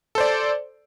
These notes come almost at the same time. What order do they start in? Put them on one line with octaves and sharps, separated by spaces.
A4 C5 D5